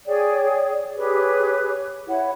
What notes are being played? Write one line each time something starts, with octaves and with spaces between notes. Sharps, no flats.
G#4 C#5 D5 G5
G4 G#4 B4 C#5
E4 C#5 F#5